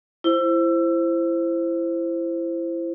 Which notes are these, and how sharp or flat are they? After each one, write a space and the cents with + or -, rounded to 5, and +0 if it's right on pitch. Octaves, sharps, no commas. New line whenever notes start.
E4 +25 C5 +5